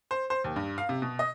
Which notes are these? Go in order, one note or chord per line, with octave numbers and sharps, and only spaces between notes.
C5
C5
D#2
G2
F5
C3
B2
D#5